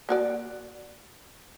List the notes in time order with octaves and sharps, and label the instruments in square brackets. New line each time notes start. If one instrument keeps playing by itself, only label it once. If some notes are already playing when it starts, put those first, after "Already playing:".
[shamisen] A#3 F#4 D5